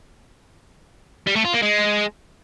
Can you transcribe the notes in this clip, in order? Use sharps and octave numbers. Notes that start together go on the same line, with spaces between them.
G3
A3
F4
A#3
G#3